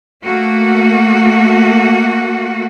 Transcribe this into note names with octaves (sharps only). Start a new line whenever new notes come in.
A3 A#3 F#4